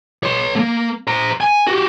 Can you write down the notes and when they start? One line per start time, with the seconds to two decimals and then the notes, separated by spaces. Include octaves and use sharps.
0.23 C#5 C6
0.56 A3 A#3
1.07 C5 A#5
1.41 G#5
1.67 F#4 G4